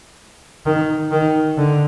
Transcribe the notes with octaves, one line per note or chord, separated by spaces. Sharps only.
D#3
D#3
D3